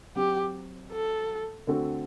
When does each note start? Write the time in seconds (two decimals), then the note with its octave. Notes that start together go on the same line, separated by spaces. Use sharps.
0.16 F#3 C4 F#4 G4
0.92 A4
1.67 D3 A3 C4 F#4 A4